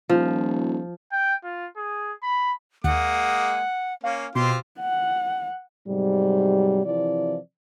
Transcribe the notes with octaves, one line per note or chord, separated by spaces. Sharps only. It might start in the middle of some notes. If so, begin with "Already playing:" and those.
D#1 F3
G5
F4
G#4
B5
D#2 G#3 A#3 F#5 D#6
A#3 C#4 F5
B2 C4 F4 G4 C6
F#5
G#2 C3 F#3 G3
C3 E3 F3 C4 E4 D5